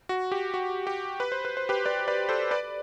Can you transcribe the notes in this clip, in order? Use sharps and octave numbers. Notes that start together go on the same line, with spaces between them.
F#4
G4
F#4
G4
B4
C5
B4
C5
G4 B4
B4 D5
B4 D5
A4 C5
B4 D5